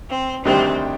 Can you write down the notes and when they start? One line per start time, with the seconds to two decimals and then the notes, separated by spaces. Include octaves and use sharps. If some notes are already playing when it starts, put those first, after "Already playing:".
0.10 C4
0.45 D2 C3 D#3 G3 C4 D4